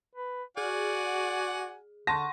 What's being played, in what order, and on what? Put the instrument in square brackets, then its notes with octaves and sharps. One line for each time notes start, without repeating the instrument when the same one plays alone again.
[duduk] B4
[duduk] F#4 [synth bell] G#4 [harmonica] D5 F#5 G#5
[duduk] D3 [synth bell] F#5 C6 C#6 [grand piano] A5 A#6